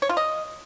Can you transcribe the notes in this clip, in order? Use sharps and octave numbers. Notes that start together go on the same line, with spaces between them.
C#5
F4
D#5